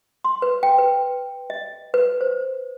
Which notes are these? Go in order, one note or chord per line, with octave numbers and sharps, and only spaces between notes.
C6
B4
G5
B4
D#5
B4
C5